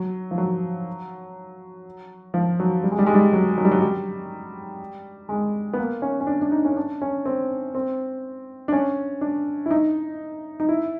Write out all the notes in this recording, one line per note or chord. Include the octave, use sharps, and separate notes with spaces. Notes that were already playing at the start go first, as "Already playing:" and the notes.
Already playing: F#3
F3
F#3
F3
F#3
G3
G#3
G3
G#3
G3
F#3
F#3
G3
F#3
G3
G#3
B3
A#3
C#4
C#4
D4
D4
D#4
C#4
D4
C#4
C4
C4
D4
C#4
D4
E4
D#4
D#4
E4